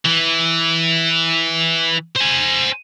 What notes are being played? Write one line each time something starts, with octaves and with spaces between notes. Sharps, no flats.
E3
C5 G#5